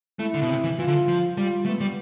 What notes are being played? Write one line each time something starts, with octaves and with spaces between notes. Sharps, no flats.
A3 E4
D3
B2
C3
E3
E3 F4
D3
F3
G3 F4
A3 B3
G3